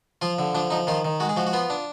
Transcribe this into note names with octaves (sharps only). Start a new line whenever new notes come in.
F3 F4
D3
F3 D4
F3 D#4
D#3 F4
D#3
G#3 F#4
G#4
F3 F#4
F#4
B3 F4
D4